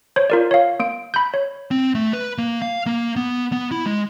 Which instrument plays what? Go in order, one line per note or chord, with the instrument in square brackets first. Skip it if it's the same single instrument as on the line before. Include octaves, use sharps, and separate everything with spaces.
[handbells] C5 C#5
F4 A#4 D5
C#5 F5
A#3 D7
B5 G6
C#5
[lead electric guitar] C4
A3
B4
A#3
F5
A#3
B3
B3
E4
G#3